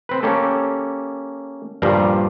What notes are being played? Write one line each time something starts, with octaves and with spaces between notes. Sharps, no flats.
C4 B4
A#3 C#4 G4 A4
G2 A#2 F3 G3 A#4 F5